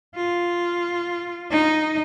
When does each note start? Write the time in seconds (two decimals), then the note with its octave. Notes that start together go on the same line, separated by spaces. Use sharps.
0.16 F4
1.51 D#4